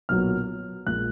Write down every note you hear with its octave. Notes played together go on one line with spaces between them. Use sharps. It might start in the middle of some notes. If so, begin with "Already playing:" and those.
B1 A#2 F#3 B3 F6
A#1 A#2 G#3 F#6